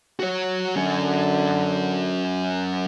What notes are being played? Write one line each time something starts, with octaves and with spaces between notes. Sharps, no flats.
F#4 C#5
D3 F#3 C#4